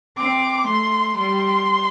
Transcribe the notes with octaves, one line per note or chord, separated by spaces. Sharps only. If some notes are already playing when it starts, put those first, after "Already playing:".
C4 D6
A3 C6
G3 C6